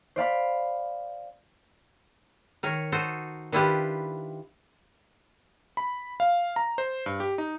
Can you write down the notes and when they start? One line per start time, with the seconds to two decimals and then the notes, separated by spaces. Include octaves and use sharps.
0.16 C5 D5 F5 B5
2.63 D#3 A#4 C#5
2.92 D#4 F#4 A4 C5
3.52 D#3 D4 E4 F4 G4 B4
5.77 B5
6.20 F5
6.56 A#5
6.78 C5
7.06 G2
7.20 G4
7.38 D#4